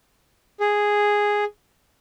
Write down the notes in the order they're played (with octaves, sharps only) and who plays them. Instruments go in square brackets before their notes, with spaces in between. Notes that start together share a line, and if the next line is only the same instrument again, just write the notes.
[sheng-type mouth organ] G#4